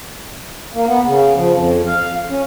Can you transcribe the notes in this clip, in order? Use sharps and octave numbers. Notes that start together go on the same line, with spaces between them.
A#3
B3
C#3
F3
F2
F5
C#4